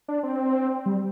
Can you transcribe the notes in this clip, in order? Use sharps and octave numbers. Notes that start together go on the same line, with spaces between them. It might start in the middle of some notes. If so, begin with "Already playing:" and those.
D4
C4
G3